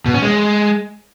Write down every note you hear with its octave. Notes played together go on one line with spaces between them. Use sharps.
B2
C#4
G#3